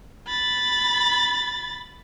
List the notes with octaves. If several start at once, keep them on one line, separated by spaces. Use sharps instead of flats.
B5 A6